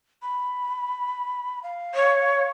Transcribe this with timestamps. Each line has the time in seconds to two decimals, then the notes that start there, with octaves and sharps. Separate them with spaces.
0.22 B5
1.63 F5
1.95 C#5